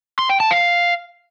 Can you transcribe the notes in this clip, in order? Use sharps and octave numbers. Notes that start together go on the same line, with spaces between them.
C6
G5
A5
F5